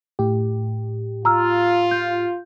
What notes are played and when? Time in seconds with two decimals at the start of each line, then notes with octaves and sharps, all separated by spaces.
0.19 A2 G4
1.25 F4 A#5 E6 F6
1.91 G6